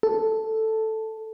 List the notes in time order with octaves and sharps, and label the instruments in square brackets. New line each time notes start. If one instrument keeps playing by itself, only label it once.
[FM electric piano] A4